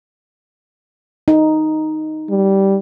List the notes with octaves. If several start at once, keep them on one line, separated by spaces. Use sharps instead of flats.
D#4
G3